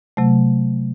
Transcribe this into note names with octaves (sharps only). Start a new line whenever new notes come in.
C3 F#3 A3